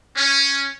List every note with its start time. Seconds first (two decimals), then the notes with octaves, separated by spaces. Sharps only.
0.17 C#4